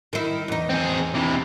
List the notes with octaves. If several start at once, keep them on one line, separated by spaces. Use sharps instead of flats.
D#3 E4
E2 D#4
C4 G#4
C3 E3